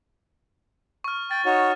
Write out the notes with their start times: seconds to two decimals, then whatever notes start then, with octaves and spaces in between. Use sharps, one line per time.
1.04 C#6 F6
1.31 G5 A6
1.46 D#4 F#4 C#5